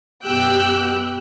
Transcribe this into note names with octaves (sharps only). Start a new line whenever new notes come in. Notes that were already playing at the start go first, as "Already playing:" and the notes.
F#2 B2 G4 G5 E6 F#6